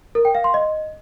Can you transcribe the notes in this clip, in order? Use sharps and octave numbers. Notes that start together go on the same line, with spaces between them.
A#4
G5
F5
C6
D#5